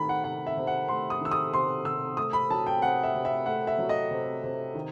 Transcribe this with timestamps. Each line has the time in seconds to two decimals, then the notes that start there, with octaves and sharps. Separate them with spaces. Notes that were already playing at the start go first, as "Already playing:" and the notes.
Already playing: D#3 A3 B5
0.09 F#5
0.24 C3 F#5
0.47 E5
0.57 C3
0.67 F#5
0.88 A3 C6
1.10 D#6
1.21 D#3 E6
1.31 D#6
1.53 C3 C6
1.85 C3 E6
2.17 A3 D#6
2.33 B5
2.50 F#3 A5
2.67 G5
2.82 C3 F#5
3.03 E5
3.15 C3
3.25 E5
3.46 A3 F#5
3.67 E5
3.78 F#3
3.89 D#5
4.11 C3
4.44 C3
4.75 D#3